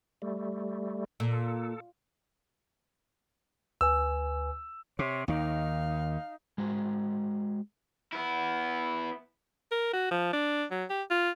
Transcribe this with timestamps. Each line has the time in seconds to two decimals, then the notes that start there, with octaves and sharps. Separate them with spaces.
0.22 G3 A3
1.20 A#2 A4
3.81 D2 B4 G#5 E6
4.99 C3 C#5
5.28 D#2 D#3 D#4 F5
6.58 G#3 F#4 C5
8.12 B3 E4
9.72 A#4
9.93 F#4
10.11 F3
10.33 D4
10.71 F#3
10.90 G4
11.11 F4